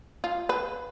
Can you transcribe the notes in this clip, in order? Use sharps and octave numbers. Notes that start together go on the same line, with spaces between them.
F4
B4